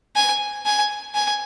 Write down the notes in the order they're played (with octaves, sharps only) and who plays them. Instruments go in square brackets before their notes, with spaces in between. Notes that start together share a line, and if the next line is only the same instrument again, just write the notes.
[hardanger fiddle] G#5
G#5
G#5